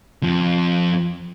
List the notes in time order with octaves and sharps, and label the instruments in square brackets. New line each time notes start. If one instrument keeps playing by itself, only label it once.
[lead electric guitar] F2 F3